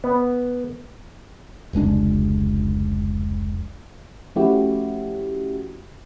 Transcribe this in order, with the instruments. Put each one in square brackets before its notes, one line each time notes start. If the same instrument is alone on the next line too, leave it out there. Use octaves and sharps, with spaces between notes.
[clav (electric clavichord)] B3
[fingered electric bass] F1 C#2 G#3 D4
[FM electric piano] F3 A3 C#4 E4 F#4 G4